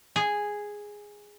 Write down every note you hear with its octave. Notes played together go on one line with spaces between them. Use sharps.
G#4